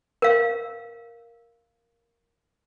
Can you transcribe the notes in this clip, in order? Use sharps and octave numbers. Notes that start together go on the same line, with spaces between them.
A#4 F5